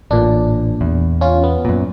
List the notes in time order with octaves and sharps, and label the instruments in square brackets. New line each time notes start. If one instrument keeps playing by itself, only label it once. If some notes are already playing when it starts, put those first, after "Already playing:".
[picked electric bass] A1 [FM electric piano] A#2 D4
[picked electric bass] E2
[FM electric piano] C#4 F4
B3
[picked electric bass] F#2 A#2